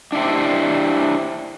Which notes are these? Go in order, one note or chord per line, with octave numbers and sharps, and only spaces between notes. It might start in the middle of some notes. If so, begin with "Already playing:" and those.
D4 E4 G4 C5